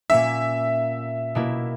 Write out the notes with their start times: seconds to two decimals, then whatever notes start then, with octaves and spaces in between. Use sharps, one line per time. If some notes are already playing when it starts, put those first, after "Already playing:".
0.10 A#2 A#3 C#4 E5
1.35 B2 A#3 E4